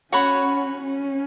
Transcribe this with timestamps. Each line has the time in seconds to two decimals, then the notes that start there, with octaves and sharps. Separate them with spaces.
0.12 C#4 F#4 C#5 F#5 B5
0.82 C#4